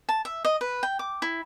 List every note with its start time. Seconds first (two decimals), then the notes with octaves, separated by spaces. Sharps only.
0.09 A5
0.25 E5
0.45 D#5
0.61 B4
0.83 G5
0.99 D6
1.22 E4